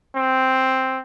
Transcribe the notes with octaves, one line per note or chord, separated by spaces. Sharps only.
C4